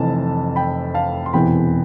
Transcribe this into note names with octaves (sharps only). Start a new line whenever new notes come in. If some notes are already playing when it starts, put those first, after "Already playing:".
Already playing: F1 F2 E3 A5
G5 B5
F5 A5
C6
E1 E2 C3 E3 G5 B5